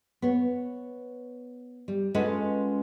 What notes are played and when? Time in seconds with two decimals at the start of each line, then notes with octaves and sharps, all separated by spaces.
0.22 B3 C#5
1.88 G3
2.15 G#3 C#4 F4 A4 B4 F#5